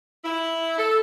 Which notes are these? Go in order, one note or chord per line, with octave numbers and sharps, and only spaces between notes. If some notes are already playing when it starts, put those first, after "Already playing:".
E4
A4